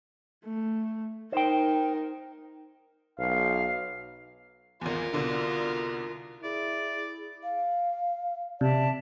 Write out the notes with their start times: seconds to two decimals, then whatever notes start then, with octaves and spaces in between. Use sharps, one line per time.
0.45 A3
1.32 D#4 A#4 C5 G5
3.19 B1 F5
4.81 G#1 E2 F4 A#4
5.13 C2 B2 D3
6.44 E4 G#4 D5
7.43 F5
8.61 C3 D5 E5 A5